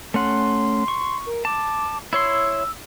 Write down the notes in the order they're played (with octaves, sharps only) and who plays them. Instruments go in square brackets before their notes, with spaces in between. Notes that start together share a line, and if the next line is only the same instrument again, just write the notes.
[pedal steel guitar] A3 C#4 F#5 [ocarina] C6
[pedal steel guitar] C#6
[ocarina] A#4
[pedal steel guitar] A5 [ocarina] D6
[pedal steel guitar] E4 C#5 C6 [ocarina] E6